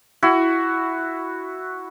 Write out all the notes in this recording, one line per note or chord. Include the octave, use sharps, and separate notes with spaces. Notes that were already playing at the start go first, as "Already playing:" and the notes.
E4 F#4